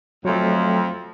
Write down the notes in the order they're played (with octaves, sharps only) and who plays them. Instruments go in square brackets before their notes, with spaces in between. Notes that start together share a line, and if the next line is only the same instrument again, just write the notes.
[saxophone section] F2 [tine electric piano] F#3 A3